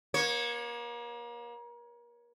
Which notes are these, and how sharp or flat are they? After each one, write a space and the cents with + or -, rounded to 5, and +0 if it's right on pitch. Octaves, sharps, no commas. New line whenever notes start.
A#3 +35 C#5 -10